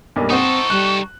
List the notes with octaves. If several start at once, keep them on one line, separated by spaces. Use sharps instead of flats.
B1 G2 A#3
C4 D#4 A4 C5 F#5 C#6 D#6
G3 F#6